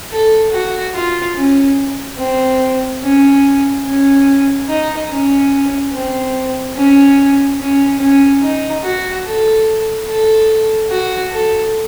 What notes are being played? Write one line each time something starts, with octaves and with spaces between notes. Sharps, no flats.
A4
F#4
F4
C#4
C4
C#4
C#4
D#4
C#4
C4
C#4
C#4
C#4
D#4
F#4
A4
A4
F#4
A4